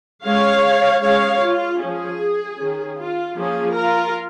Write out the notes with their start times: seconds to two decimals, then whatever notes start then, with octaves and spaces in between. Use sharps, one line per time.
0.24 G#3 C#4 C#5 F5
1.02 G#3 C#4 C#5 F5
1.42 F4
1.80 F3 C#4 G#4
2.58 D#3 C#4
2.97 F4
3.36 F3 A#3 C#4 G#4
3.75 F4 A#4